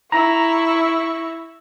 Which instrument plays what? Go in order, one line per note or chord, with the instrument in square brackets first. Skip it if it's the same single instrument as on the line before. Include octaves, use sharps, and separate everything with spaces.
[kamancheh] E4 C#6 [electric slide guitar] A#5